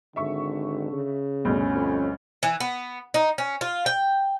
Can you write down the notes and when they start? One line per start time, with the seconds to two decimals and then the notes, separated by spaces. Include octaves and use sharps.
0.16 G#1 D3 E5 C#6
0.92 C#3
1.45 D2 G2 B2 C#4
1.75 F2
2.43 E3
2.60 B3
3.14 D#4
3.38 C#4
3.61 F4
3.86 G5